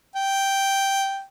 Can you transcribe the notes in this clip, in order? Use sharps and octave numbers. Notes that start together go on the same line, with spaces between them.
G5